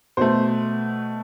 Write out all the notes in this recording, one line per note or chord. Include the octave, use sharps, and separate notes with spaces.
B2 A3 C5